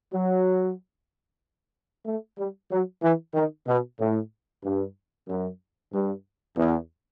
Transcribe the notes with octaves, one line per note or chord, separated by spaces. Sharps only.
F#3
A3
G3
F#3
E3
D#3
B2
A2
G2
F#2
G2
E2